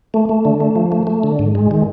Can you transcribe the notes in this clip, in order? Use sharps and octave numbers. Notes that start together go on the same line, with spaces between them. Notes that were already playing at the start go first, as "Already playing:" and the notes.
A3
A3
D3
A3
F3
A3
A3
D3
G#2
G#3
D#3